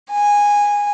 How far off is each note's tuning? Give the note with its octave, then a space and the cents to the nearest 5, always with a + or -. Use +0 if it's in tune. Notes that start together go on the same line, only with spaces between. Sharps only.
G#5 -15